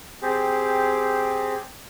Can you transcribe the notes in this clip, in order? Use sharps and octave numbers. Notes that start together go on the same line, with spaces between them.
C4 G4 G#4